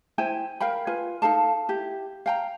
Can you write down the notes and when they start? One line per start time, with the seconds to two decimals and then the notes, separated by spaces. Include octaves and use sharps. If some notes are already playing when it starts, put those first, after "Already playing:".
0.18 E4 C5 G5 G#5
0.60 A#4 F5 G5 B5
0.87 F4 B4 G#5
1.22 D#4 A4 F5 A5
1.69 E4 G4
2.26 F5 G5 A#5